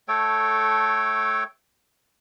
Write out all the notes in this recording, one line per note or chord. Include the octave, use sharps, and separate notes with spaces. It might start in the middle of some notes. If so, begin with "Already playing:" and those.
A3 A4 C#5 G5